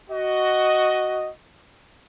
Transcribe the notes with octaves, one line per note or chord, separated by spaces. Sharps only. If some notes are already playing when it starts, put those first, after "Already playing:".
F#4 D#5